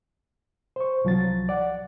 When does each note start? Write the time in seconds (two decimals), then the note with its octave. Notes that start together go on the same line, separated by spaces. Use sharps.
0.76 C5 C#6
1.05 C2 F3 F#3 A6
1.49 D5 F#5